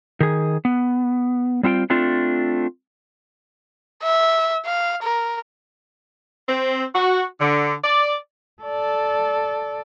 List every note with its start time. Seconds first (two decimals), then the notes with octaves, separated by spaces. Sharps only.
0.20 D#3 G#4
0.65 B3
1.63 G3 C4 F4 F#5 G5
1.90 A3 C4 D4 F4
4.03 E5
4.66 F5
5.02 A#4
6.48 C4
6.95 F#4
7.40 D3
7.84 D5
8.62 A4 D5